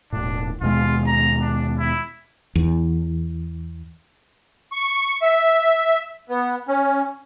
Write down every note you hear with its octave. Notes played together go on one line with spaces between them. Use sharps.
E1 A2 D4
D#2 B2 G#3 F4
A#5
D4
E4
E2
C#6
E5
B3
C#4